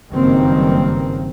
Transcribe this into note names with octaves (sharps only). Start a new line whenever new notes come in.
F#1 G2 D#3 A#3 C4